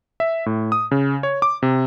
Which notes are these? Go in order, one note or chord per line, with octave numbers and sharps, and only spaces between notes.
E5
A2
D#6
C#3
C#5
D6
C3